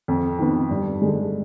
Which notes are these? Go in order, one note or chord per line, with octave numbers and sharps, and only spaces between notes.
F2
D#3 B3
G2
D3 G#3